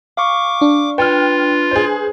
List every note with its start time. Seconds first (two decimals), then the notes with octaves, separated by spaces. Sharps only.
0.17 F5 C#6 D6
0.61 D4
0.98 F4 B4 G5 F6
1.71 G#4 C5